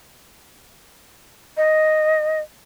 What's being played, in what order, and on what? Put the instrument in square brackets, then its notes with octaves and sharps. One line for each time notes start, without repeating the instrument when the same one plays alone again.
[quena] D#5